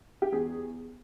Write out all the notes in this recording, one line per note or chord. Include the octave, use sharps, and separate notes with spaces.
G4
E2 G#4